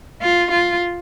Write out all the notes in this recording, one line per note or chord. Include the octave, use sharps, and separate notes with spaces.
F4
F4